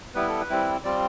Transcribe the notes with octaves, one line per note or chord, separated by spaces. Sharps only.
G3 B3 E4 B4
A4
B4
G3 C4 E4
G3 C4 F4 D5